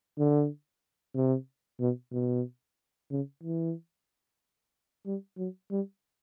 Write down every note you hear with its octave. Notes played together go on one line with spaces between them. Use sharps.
D3
C3
B2
B2
C#3
E3
G3
F#3
G3